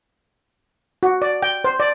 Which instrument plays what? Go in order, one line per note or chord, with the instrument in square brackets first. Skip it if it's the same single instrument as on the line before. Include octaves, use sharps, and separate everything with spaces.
[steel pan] F#4
D5
G5
C5
D5